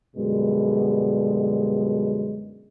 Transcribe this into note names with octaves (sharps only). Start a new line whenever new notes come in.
F#2 B2 D3 G3 G#3